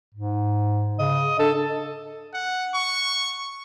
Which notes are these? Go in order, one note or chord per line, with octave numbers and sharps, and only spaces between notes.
G#2
C#3 D#5
D4 A4
F#5
C#6